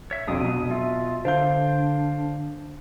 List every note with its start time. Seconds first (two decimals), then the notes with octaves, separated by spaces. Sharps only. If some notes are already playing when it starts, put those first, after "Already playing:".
0.11 C#5 E5
0.27 B1 F2 D3 D4 D#6
0.40 B2 F#3 D#6
0.71 F4 E5
1.25 D3 D4 C5 F5 G6